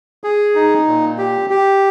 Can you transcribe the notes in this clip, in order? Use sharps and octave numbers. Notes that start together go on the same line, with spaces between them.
G#4
D#4
A#2
G4
G4